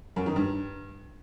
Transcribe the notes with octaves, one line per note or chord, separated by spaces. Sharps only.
F#2
D#3
G2